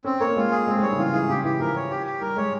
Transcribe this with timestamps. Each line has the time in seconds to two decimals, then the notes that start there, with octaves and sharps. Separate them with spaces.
0.04 C4 C#4
0.20 A#3 C#5
0.36 G#3 F4
0.51 G#4
0.67 G#3 C4
0.77 G#3
0.82 G3 C#5
0.92 C#3
0.98 E3 F4
1.13 E3 G#4
1.29 C#3 G4
1.44 E3 G4
1.60 F3 A#4
1.76 C#5
1.90 G4
2.06 G4
2.21 G3 A#4
2.37 G#3 C#5